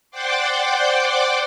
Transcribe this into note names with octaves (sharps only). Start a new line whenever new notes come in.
C5 D5 F#5 G5 C6 D6